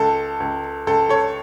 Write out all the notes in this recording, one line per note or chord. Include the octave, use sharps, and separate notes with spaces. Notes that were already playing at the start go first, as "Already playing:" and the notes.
Already playing: C#2 A4
C#2
C#2 A4
A4 C#5